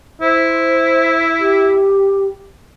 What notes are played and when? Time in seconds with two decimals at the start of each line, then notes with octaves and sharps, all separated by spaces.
0.22 E4 C5
1.40 G4